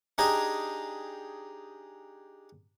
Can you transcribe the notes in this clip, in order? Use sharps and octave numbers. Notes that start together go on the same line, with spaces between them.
D4 D#4 G4 G#4 G#5 A#5